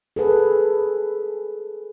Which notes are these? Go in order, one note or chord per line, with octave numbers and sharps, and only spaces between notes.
G#4 A4 B4